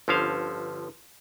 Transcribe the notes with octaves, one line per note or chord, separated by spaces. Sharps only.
G1 D3 F3 C#4 C5 F5